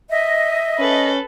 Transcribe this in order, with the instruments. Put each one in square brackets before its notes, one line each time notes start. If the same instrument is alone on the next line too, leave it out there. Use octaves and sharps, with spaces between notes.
[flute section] D#5 [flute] E5
[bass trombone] C#4 [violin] A4 B4